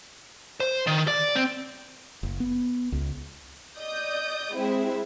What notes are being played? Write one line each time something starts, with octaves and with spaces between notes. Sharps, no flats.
C5
D#3
D5
C4
F#1
B3
C#2
D5 D#5 D#6 G6
G#3 C4 E4 G#4 E5